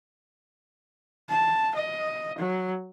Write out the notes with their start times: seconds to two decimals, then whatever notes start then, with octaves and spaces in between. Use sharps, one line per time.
1.29 A5
1.75 D#5
2.38 F#3